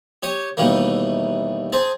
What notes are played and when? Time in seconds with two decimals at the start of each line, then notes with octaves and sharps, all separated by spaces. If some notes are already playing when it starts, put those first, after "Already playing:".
0.23 G4 C#5 D#6
0.57 D#2 B2 E3 G3 A3 A#3
1.72 C4 G#4 A5